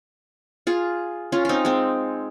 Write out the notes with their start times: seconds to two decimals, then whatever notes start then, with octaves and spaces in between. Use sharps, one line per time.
0.67 F4 G#4
1.32 C#4 F4
1.45 C4 D#4 F4
1.65 G#3 C4